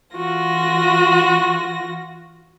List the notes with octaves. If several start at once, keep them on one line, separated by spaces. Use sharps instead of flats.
E3 F4 F#4 A#6